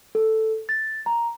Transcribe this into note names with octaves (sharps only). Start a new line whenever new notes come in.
A4
A6
A#5